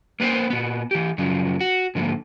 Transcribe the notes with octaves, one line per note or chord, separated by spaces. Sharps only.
A#3 B3 B4 C5
A#2 B3
E3 G4
F#2 C#3 F3 F#3
F#4
G#2 D3 F3 A#3